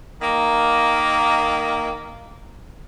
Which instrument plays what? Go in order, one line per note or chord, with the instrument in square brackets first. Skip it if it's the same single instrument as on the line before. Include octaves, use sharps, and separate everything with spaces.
[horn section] D#3 A#3